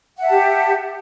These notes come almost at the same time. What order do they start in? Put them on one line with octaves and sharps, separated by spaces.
F#5 E5 A5 G4